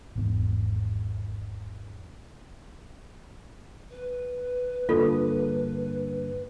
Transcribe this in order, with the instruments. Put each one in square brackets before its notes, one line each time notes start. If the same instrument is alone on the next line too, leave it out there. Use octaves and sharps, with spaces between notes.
[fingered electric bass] G#1 E2
[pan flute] B4
[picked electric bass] G2 D3 A#3 [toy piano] F4 A4